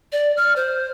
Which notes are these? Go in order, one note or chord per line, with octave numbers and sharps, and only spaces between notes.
D5
F6
C5